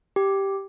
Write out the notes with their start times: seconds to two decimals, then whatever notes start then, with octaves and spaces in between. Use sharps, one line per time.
0.16 G4